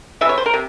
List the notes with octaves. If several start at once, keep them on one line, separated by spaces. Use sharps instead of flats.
C3 E3 E5
C#5
C5
A#4
C3